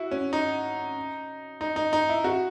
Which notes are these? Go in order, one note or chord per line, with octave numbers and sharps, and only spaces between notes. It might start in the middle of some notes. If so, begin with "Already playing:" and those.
Already playing: E4 F#4
C#4
D#4
D#4
D#4
D#4
E4
F#4